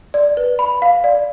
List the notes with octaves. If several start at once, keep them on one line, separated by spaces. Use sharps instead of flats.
D5
B4
B5
F5
D5